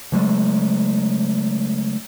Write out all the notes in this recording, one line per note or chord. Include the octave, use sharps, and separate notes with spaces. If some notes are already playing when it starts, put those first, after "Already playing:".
C#3 F#3 G#3 A3